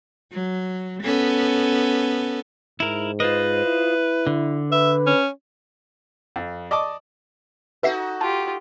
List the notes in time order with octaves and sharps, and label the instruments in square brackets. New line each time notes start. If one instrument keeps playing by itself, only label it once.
[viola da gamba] F#3
B3 C#4 A4
[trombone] G#2 [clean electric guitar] E4 A#4
[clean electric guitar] F4 C5 D#5 [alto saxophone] B4
[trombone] E4
[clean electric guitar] D3
[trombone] B4 [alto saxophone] E5
[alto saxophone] C#4
[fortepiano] F2
D5 D#5 A5 C#6 D6
[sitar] D#4 F#4 A4 [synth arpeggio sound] B4 E5 C7
[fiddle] F4 G4 [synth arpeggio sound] A5